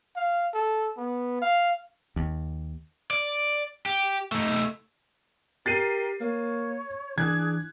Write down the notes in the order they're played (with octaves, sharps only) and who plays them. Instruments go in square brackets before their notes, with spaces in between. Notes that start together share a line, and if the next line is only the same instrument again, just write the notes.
[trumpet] F5
A4
B3
F5
[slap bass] D#2
[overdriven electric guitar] D5
G4
A3 D#4
[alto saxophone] G4 [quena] A#4 [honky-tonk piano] A6 C7 D#7
[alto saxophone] A#3 [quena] C#5
[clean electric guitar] E3 [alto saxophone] D4 [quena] G#4 [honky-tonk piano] F#6 G#6